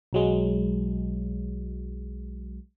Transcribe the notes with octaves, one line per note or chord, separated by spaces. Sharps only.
B1 F#3 G#3